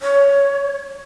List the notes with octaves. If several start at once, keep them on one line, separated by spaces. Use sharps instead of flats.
C#5